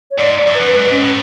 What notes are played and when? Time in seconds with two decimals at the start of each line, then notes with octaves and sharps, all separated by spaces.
0.11 C#5
0.18 G#2 D5
0.36 D5
0.46 F#2
0.55 B4
0.60 F#2
0.73 G#2 B4
0.88 G#2 C#4
1.01 A2